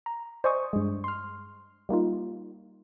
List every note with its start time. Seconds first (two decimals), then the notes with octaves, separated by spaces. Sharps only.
0.06 A#5
0.44 C5 D5 D#5 G#5 C#6 D#6
0.73 G2 G#3
1.04 C6 F6
1.89 G3 A#3 D#4 F4